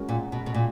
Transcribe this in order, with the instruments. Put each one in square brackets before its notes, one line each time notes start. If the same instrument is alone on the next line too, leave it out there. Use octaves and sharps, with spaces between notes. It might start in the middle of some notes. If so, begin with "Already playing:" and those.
Already playing: [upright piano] G#3 C#4 F#4 A#4
[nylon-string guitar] A#2
B2
B2
A#2